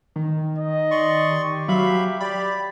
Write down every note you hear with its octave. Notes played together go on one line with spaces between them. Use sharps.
D#3
D#5
D5 C6 C#6
G4
F#3 E5 F5 B5
G4 D5 B5